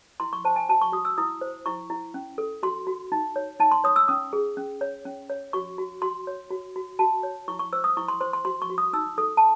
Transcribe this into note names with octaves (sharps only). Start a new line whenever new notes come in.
E4 C6
C#6
C5 A5
G#5
F#4 A5
C#6
F#4 D#6
E6
E4 D#6
C5
E4 C#6
E4
C#4
A4
F#4 C6
F#4
D#4
C#5
D#4 A5
C6
C#5 D#6
E6
C#4 D#6
G#4
C#4
C#5
C#4
C#5
F#4 C#6
F#4
F#4 C6
C#5
F#4
F#4
F#4 A5
C#5
E4 C#6
C#6
C5 E6
D#6
E4 C#6
C6
C5 C6
C6
F#4 C6
C#6
F#4
D#6
D#4 E6
A4 D#6
A5